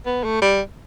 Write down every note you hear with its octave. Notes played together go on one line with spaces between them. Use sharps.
B3
A3
G3